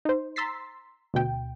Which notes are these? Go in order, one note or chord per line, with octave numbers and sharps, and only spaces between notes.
D#4 C5
A#5 C6 E6 A6 B6 C7
D2 B2 G5